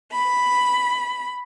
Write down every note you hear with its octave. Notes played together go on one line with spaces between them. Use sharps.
B5